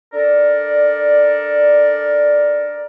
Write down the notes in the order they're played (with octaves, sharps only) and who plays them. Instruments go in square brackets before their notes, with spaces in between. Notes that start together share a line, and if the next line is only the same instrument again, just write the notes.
[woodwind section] D4 A4 A#4 D5